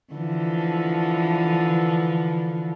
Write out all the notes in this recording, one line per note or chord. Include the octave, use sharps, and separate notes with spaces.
D3 E3 F3